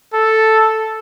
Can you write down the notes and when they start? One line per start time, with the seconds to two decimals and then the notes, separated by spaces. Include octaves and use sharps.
0.14 A4